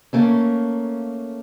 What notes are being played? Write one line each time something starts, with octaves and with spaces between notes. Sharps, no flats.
A3 A#3 C#4